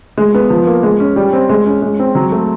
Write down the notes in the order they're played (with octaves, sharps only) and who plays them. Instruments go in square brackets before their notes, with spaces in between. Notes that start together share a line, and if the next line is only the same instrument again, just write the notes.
[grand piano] G#3
B3
F3
A#3
G#3
C#4
G3
C4
G#3
C#4
G#3
C4
F#3
A3